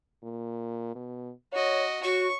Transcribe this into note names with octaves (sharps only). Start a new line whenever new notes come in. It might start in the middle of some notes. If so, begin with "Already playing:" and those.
A#2
B2
F#4 C#5 D#5
F#4 C#5 C#6